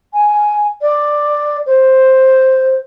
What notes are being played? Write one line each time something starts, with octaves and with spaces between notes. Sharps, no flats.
G#5
D5
C5